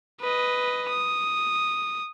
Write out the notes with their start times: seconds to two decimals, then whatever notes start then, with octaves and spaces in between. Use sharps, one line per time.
0.20 B4 D#5
0.89 D#6